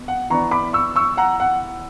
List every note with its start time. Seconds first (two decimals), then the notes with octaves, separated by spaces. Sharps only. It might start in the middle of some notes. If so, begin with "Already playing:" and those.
Already playing: B2
0.08 F#5
0.30 E3 B3 D4 A#5 C#6
0.51 B5 D6
0.73 C#6 E6
0.96 C#6 E6
1.17 F#5 A#5
1.40 F#5